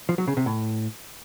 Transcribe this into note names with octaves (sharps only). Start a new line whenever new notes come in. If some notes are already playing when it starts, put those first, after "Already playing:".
F3
F#3
C#3
C3
A2